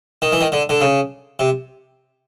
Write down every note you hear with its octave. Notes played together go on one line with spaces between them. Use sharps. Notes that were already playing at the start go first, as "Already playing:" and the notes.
D#3
E3
D#3
D3
D3
C#3
C3